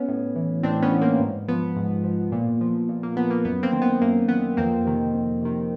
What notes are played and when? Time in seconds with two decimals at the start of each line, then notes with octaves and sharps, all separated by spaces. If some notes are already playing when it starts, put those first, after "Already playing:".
Already playing: B3 C#4
0.08 A2
0.36 E3
0.63 A2 C4 D4
0.82 B3 C#4
0.91 E3
1.01 A#3 C4
1.19 G#2
1.48 F3 B3
1.76 G#2
2.04 F3
2.32 A#2
2.61 F3
2.89 A#2
3.03 A#3
3.16 F3 B3
3.30 A#3
3.45 F#2 B3
3.63 A#3 C4
3.72 D#3
3.82 B3
4.01 F#2 A#3
4.28 D#3 B3
4.57 F2 A#3 C4
4.85 C3 D#3
5.14 F2
5.42 C3 D#3